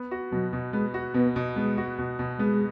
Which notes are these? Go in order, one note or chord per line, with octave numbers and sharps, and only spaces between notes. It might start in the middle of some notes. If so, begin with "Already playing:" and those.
Already playing: B3
F#4
B2 F#3
B2
G#3 B3
F#4
B2 B3
B2
G#3 B3
F#4
B2
B2
G#3 B3